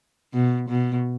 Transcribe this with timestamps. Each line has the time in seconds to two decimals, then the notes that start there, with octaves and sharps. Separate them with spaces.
0.34 B2
0.69 B2